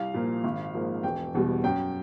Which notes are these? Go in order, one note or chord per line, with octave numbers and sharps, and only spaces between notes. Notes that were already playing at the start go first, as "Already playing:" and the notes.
Already playing: C2 F5
A#2 F3 A#3
G#1
G#2 F3 A#3
E1 G5
E2 B2 G3
F#2 G5